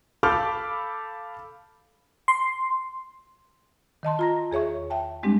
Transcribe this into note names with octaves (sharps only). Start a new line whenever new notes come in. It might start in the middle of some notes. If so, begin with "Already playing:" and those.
A4 F5 B5 D6 F6 G6
C6
D#3 D#5 A5 C6
F4 A#5 A#6
E2 G#4 C#5 E5 C#6
E5 G5 A5
G3 G#3 C4 D4 G4